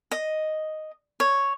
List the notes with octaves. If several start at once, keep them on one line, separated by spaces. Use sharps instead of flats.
D#5
C#5